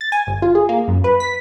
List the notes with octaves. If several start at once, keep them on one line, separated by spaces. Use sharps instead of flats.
A6
G#5
G1
F4
G#4
A#3
F#2
B4
B6